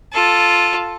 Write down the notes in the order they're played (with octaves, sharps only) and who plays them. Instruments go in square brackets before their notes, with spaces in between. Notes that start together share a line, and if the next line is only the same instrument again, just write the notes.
[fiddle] F4 A4